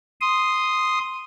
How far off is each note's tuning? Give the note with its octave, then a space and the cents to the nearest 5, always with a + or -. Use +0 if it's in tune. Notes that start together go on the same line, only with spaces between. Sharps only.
C6 -5 D#6 +0